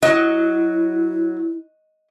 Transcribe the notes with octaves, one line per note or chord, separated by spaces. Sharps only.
F#3 E4 D#5